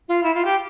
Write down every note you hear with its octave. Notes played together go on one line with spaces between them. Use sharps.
F4
E4
F4
G4